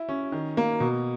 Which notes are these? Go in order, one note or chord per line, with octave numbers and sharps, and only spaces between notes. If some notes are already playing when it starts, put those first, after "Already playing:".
Already playing: E4
C#4
D#3
A#3
B2